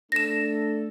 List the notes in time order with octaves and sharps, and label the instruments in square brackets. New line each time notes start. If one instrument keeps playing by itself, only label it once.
[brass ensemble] A3 D4 A4 [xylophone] A#6 E7